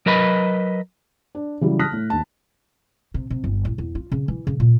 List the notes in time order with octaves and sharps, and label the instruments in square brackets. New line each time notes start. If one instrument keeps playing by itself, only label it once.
[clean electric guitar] F#3 A#4 B4 D#5 B5
[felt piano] D4
C#3 E3 F#3 G3
A5 D#6 F6 F#6 A#6 B6
A2
D#2 A5
[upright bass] C3
C3
G1
A1
E2
F4
C#3
E3
C#3
A#2